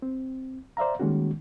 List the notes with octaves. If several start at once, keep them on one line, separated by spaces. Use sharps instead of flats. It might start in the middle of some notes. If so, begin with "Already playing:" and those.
C4
C5 D5 E5 F5 A#5
D#3 G3 G#3 A#3 C#4 F#4